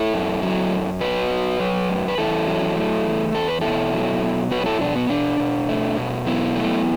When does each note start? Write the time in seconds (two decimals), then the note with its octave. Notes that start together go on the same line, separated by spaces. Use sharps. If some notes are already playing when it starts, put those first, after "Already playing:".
Already playing: E4 A4
0.14 F#2
0.42 F#3
0.71 F#2
1.01 F#3 F#4 B4
1.31 F#3
1.60 F#3
1.89 F#2
2.08 B4
2.18 E2 E4 A4
2.47 F#3
2.76 A3
3.05 E2
3.34 E2 A4
3.48 B4
3.61 B2 E4 A4
3.94 F#3
4.23 B2
4.51 F#3 F#4 B4
4.61 F#4
4.66 E4 A4
4.81 B2 D4
4.96 B3
5.09 B2 D4
5.40 B2
5.69 A3
5.97 B2
6.26 F#3 B3 E4
6.56 A3